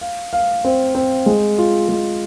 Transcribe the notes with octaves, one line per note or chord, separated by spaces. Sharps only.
F5
F5
C4
C4
G#3
F4
G#3